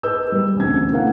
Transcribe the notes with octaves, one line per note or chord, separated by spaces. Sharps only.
G#4 A#4 B4 D#5 E6 G6
G3
E1 D2 C#3 C4 G#6
A3 A#3 C#4 E4 F5 F#5